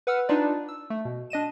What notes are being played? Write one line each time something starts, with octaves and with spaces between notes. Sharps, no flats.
B4 F#5 E6 F6
D4 D#4 F4 B4 D5
E6
A3
B2
D4 D#5 D#7 E7